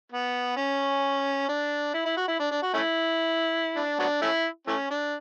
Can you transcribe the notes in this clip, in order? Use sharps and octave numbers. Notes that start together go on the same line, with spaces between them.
B3
C#4
D4
E4
E4
F#4
E4
D4
D4
F#4
A3 C#4 E4
D4
F#3 B3 D4
A3 C#4 E4
E3 A3 C#4
D4